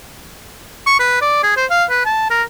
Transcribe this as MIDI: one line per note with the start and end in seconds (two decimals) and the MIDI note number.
0.86 0.98 85
1.00 1.21 71
1.21 1.41 74
1.43 1.53 68
1.57 1.65 72
1.70 1.84 77
1.90 2.05 71
2.05 2.30 81
2.30 2.43 70